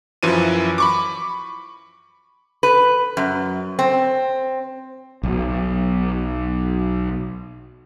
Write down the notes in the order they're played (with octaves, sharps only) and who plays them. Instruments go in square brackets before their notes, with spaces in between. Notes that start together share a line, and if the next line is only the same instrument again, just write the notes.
[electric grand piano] F#2 E3 F3 D#7
B5 C#6 D6
[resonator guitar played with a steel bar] B4
F#2
C4
[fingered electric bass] B1 F#3